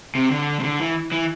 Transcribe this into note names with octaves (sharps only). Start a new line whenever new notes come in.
C3
D3
C3
D3
E3
E3